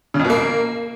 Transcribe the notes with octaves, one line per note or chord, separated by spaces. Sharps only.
C#3
F2
B2
A#3